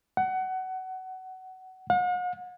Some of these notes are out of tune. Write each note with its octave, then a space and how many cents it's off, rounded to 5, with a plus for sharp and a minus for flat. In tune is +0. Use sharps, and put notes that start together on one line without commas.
F#5 +20
F#5 -45